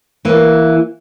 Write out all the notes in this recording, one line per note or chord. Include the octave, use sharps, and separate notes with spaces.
E3 A#3